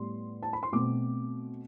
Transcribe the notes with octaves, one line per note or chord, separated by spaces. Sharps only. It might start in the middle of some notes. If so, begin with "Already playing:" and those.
Already playing: A2 G3 B3 C6
A5
B5
C6
B2 A3 C4 D6